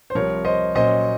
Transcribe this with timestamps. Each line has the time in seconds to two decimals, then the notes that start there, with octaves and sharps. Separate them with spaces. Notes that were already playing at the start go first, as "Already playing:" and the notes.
0.10 C5
0.15 C2 C3 F3 A#4 C#5
0.45 C5 D#5
0.75 A#2 F#3 C#4 C5 D#5